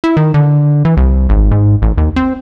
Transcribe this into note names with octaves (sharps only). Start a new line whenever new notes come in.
E4
D#3
D3
E3
C2
G#1
G#2
A1
D#2
C4